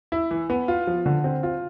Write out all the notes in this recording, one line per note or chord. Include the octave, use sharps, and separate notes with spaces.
E4
E3
B3
F4
F3
D3
C4
F4